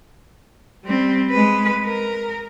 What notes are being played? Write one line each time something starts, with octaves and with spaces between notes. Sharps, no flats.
G3 C4
G#3 B4
A#4